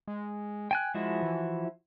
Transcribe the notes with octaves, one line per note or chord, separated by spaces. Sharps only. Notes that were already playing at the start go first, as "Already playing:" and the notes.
G#3
G5 G#5 F#6
F3 G#3 E4 F#4
E3